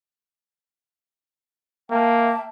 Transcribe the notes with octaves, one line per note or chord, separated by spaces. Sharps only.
A#3 E5 G5 A5